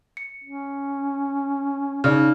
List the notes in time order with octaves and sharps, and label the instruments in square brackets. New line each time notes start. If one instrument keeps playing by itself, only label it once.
[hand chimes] C#7
[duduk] C#4
[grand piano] C#3 [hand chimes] D#4 D5 F6